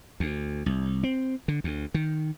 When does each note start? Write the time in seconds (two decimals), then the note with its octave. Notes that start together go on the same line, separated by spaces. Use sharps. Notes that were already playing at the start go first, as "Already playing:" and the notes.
0.20 D2
0.66 C2
1.03 C4
1.48 D3
1.64 D2
1.94 D#3